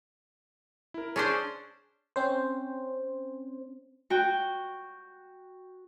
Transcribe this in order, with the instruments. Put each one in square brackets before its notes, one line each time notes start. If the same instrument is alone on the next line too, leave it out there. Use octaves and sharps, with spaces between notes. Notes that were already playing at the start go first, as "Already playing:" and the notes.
[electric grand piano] E4 A#4
[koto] C#4 D4 C5 [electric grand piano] G#4 C#5 A5
[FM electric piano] C4 C#4 C5
[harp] F#4 G5